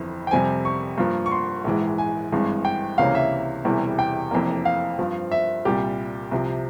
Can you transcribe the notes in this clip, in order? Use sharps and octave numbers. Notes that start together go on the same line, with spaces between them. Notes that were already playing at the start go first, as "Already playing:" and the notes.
Already playing: G1 F2 E3
G5
F2 C3 G3 C4 G#5
C#6
G2 F3 A#3
C#6
C6
A#1 G#2 E3 G#3
G#5
G#1 G2 E3 G#3
G5
C#2 C3 E3 A#3 C#4 F5
E5
E1 E2 C3 E3 G3
G5
F1 F2 E3 A#3
F5
G2 F3 C4
E5
C2 A#2 G3 G4
C2 C3 F3